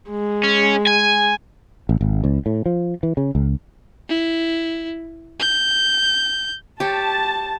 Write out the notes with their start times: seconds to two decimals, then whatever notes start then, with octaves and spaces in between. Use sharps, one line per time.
0.10 G#3
0.43 C#4
0.87 G#5
1.89 A1
2.01 G#1
2.24 C#2
2.46 A2
2.66 F3
3.03 E3
3.17 C#3
3.35 C#2
4.09 E4
5.40 G6
6.80 G4 C#5 A5